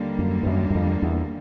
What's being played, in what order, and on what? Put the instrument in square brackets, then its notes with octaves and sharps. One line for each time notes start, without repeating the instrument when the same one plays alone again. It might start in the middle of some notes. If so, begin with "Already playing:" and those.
Already playing: [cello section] D#2 D3 G3 A#3
[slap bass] F#2
G2
F#2
F#2
F2
E2